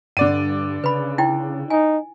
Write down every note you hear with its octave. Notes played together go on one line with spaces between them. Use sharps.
G2 D3 D5 F#5 D#7
C#3 B4 B5
D#4 E4 G5
D#4 G#5